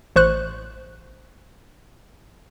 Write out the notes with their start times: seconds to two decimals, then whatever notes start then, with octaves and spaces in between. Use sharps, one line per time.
0.16 A1 C5 C#6 F#6